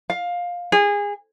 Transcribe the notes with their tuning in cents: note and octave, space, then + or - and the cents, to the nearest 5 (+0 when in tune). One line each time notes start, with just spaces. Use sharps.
F5 +15
G#4 -25